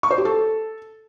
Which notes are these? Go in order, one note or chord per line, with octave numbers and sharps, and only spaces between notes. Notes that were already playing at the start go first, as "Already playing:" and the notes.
C#6
C5
G4
A4